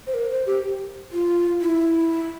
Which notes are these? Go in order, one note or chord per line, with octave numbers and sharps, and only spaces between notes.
C5
A#4
C5
G4
F4
E4